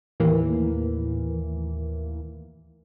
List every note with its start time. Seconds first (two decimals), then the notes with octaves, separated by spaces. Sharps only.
0.20 D#2 A2 E3 A#3